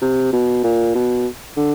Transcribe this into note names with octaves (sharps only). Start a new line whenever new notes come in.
C3
B2
A#2
B2
D3